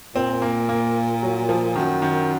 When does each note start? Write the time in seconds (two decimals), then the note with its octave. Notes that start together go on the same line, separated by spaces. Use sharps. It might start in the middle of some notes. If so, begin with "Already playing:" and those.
0.15 A#2 C4
0.42 A#3
0.69 A#3
1.23 F#3
1.49 F3
1.76 F#2 D#3
2.02 D#3